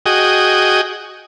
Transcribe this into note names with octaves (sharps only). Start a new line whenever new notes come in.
F#4 G#4 D#5 G5